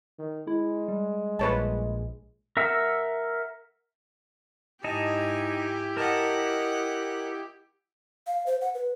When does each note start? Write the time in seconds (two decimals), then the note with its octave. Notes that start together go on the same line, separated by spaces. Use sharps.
0.19 D#3
0.47 G#3 E4
0.88 G3
1.39 A#1 B4 C#5 A5
2.57 A#4 E5 F#5 E6
4.84 G#2 D#4 E4 G4 D#5 G#5 A5
5.97 A#4 D#5 F#5 A5 F#6
8.27 F5
8.46 C5
8.61 F#5
8.74 B4